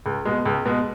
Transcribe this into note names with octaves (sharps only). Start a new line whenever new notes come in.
C#2
B2 G#3
C#2
B2 G#3